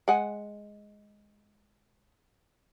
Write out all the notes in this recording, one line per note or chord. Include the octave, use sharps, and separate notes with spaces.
G#3 F#5 G#5